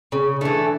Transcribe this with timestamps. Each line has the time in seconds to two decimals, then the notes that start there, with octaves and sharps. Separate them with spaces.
0.12 C#3 C#4
0.41 E3 A3 D4